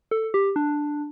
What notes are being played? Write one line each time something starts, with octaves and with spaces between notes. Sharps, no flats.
A4
G4
D4